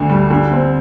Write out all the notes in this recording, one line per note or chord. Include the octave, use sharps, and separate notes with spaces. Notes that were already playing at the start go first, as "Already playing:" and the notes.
Already playing: D2 D3 D4
G3
D3
C4